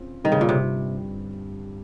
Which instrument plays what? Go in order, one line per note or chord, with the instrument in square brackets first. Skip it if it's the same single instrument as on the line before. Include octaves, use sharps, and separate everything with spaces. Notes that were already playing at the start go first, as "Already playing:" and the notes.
Already playing: [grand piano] C#3 C4 F4
[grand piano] G1 G2 G3 C4 [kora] D#3
[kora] C#3
A#2
C3